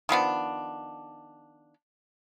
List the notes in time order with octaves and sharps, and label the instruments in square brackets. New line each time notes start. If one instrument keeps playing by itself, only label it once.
[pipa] D#3 F3 B3 D4